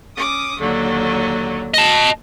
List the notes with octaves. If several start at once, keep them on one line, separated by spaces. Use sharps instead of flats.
C#4 D6 D#6
D#2 D3 F#3
D#5 A5